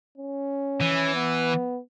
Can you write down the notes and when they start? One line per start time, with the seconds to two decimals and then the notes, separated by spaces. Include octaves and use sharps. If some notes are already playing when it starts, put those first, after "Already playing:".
0.17 C#4
0.81 E3
1.14 B3